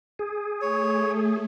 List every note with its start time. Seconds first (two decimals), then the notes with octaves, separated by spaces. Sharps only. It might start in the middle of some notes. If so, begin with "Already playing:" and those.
0.19 G#4
0.62 A3 C#5